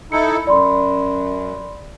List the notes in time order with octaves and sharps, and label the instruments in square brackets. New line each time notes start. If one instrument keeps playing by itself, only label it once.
[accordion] D#4 E4 A4 [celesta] B5 C#7
[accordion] F#2 [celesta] D5 B5 C6